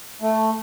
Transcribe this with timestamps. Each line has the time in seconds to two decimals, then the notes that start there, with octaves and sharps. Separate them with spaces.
0.22 A3